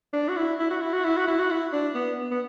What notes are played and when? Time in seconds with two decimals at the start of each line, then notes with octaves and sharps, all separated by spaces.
0.13 D4
0.28 F#4
0.37 E4
0.59 E4
0.70 F#4
0.81 E4
0.93 F#4
1.04 E4
1.16 F#4
1.27 E4
1.39 F#4
1.50 E4
1.72 D4
1.94 B3
2.31 B3